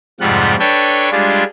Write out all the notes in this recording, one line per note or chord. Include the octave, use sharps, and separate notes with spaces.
F2 G#2 C3 G3 F4 F#5
D4 A4 B4 C#5 G5
G3 G#3 D4 F4